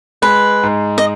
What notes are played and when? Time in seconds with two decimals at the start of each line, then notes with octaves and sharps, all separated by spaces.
0.22 G#3 B4
0.63 G#2
0.98 D#5